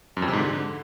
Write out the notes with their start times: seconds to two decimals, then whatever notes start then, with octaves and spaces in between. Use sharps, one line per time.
0.17 F#2
0.22 F2
0.28 C3
0.33 G#2
0.39 D3